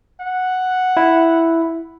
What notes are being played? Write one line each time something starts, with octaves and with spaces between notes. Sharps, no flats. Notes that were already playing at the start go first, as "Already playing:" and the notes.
F#5
E4